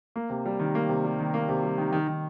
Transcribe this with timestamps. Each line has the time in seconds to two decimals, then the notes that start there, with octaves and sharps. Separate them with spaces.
0.16 A#3
0.30 C3
0.46 G3
0.59 D#3
0.75 A#3
0.89 C3
1.04 G3
1.19 D#3
1.34 A#3
1.49 C3
1.63 G3
1.78 D#3
1.92 D#3
2.07 D#3